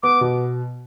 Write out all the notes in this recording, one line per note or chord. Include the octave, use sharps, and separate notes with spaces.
B3 D6
B2